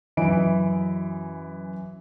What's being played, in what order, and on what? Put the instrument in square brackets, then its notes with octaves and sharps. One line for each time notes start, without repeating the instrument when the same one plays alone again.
[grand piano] F#2 E3 D#5 E5 B5 D7